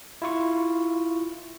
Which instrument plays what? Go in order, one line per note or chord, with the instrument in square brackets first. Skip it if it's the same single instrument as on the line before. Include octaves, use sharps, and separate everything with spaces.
[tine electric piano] E4 F4 C#6